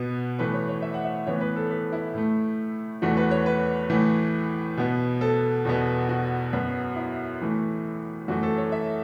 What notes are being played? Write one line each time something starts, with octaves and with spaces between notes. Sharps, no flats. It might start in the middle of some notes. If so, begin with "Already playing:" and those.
Already playing: B2 B3
A2 E3 A3 B4
C#5
C#5
E5
F#5
E5
A2 E3 B3 C#5
B4
A4
B4
E4
A2 A3
E2 E3 A3 F#4
B4
C#5
B4
A2 E3 A3
B2 B3
A4
E2 B2 B3
F#4
F#2 F#3 B3
E4
A2 E3 A3
F#2 E3 A3 F#4
A4
C#5
E5